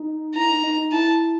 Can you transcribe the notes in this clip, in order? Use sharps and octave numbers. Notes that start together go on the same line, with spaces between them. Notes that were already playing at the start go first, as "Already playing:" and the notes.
Already playing: D#4
E4 A#5
D#4
D#4
D#4
E4 A5